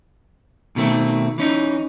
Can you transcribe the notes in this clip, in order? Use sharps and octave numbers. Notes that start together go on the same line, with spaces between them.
B2 D#3 A3 C4
E3 C#4 D#4